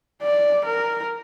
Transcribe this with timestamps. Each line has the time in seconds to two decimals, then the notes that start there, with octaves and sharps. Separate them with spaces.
0.22 D5
0.65 A#4